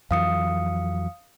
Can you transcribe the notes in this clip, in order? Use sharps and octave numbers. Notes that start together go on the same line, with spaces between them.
F2 E3 F#3 F5 D#6 C#7